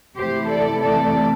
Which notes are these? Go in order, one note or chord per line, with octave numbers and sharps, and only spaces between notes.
C3 E3 A3 E4 G4 C5
A4 D5
A4 D5